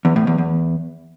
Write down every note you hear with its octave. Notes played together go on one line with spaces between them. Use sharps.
E2
A2
E2
E2